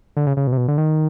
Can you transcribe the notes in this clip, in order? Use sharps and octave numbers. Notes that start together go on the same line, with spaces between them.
D3
C#3
C#3
B2
C3
B2
D3
D#3